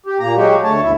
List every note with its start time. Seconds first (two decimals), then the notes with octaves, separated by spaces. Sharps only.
0.06 G4
0.20 A#2 A#3 A#5
0.36 F#3 G#3 F#4 G4
0.64 D2 A3 C#5 A5
0.83 D2 G2 B2 E4 E5